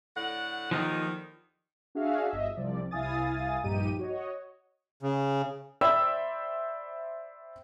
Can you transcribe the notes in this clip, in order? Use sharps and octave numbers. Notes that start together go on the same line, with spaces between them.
A2 D3 F#5
D#2 D3 D#3 F3 D#4 F4
D4 F#4 G#4 E5 F5
G1 D#5 E5
C2 C3 F3 D5
C2 E4 F5 G#5 D#6 A6
A#1 G2 D#4 G4 D#7
F#4 C#5 D#5
C#3
C5 D5 E5 G5 B5 E6